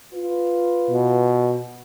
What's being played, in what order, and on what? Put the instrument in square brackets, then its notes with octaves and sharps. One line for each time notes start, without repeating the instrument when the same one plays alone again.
[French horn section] F4 B4
[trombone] B2